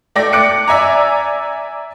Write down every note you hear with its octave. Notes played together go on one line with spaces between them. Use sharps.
A3 D5 G5 A#6
D6 F#6 C#7 D7
D5 E5 G#5 A#5